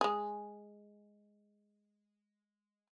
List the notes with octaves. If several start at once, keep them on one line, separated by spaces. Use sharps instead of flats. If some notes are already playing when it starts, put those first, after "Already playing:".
G#3 G#4